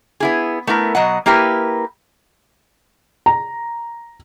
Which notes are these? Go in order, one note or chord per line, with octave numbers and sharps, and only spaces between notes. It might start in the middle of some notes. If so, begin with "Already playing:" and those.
B3 E4 G#4
A3 B3 E4 A#4
B2 F#3 D#5 F#5
A#3 E4 G4 A#4 B4
A#5